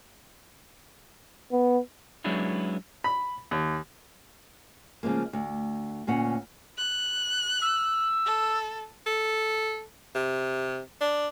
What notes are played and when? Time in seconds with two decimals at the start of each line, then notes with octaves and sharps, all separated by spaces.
1.52 B3
2.24 F#3 G#3 B3 C#4 D4 E4
3.04 B5
3.51 D#2
5.03 C#3 F3 G#3 A#3
5.33 D2
6.07 D2 A#2 C#4 F#5
6.78 F#6
7.62 E6
8.26 A4
9.07 A4
10.15 C3
11.01 D4